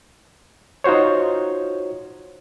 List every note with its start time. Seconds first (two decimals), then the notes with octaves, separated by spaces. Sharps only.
0.84 D#4 F4 F#4 C5 C#5